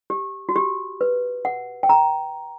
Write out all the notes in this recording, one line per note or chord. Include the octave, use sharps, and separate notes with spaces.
G4
F#4
G4
B4
F#5
G5
A#5